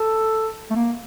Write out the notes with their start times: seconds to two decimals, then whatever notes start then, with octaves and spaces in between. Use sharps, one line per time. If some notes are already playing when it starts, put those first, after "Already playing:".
Already playing: A4
0.71 A3
0.75 A#3